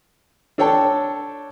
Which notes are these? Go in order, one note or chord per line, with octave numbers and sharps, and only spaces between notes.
D4 A4 C#5 G5 A5